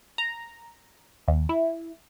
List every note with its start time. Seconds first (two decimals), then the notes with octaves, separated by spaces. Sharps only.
0.18 A#5
1.28 D#2
1.49 E4